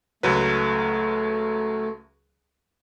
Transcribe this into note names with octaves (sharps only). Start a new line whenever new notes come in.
C#2 F#3 A3 B4